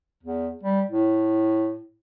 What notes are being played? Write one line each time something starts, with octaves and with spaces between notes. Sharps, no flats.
E2
G3
A2